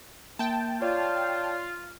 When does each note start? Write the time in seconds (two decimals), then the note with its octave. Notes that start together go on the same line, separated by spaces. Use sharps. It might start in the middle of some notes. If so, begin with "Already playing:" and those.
0.39 A#3 G5 A5
0.82 F4 C#5 D5